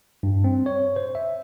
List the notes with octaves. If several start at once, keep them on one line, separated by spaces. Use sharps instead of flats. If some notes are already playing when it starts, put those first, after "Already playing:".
G2
C4
C#5
C5
E5